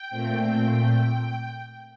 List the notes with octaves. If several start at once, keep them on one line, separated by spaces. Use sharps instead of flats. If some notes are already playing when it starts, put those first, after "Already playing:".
Already playing: G5
A#2 A3 C4